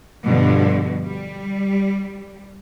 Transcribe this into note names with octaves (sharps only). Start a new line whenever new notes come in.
G2 B2 D3 F3
G3